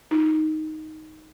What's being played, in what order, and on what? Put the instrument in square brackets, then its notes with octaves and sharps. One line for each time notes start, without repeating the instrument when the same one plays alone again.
[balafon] D#4 F4